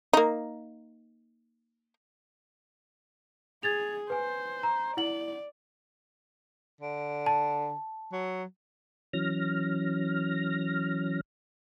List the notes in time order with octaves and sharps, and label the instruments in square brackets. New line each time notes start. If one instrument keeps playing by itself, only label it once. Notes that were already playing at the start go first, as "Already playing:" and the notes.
[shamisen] A#3 D#4
[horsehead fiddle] G#4 [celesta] G#6 A6 F7
[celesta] B4 G#5 [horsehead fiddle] C5
[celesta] A#5
[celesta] E4 F#5 F#7 [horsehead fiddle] D5
[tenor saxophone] D3
[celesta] A5
[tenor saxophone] F#3
[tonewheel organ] E3 F#3 C#4 F6 A#6